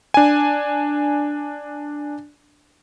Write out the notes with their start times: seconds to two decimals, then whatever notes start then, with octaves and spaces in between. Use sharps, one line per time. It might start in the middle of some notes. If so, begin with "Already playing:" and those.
0.14 D4 G#5